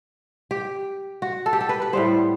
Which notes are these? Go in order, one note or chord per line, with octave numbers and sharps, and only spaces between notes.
G4
F#4
A4
G4
A4
B4
B4
A2 G3 B3 C5